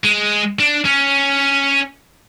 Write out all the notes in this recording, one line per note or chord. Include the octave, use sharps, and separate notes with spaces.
G#3
D4
C#4